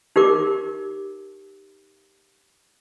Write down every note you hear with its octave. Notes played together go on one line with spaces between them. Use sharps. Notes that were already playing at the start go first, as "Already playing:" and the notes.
D#4 G4 A#4 D6